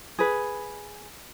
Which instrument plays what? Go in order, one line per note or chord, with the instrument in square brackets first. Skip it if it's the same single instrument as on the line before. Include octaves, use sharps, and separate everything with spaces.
[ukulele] G#4 B4